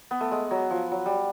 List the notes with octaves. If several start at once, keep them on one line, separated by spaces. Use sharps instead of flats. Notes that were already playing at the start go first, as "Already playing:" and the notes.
B3
A3
G#3
F#3
F3
F#3
G3